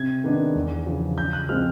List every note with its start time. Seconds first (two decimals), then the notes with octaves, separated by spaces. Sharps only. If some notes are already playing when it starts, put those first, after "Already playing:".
Already playing: C3 G#6
0.24 D#3 G#3 B3 D4
0.55 E2
0.86 C#3 F3
1.18 C#3 G6
1.33 F#6
1.49 F3 G#3 C4 F6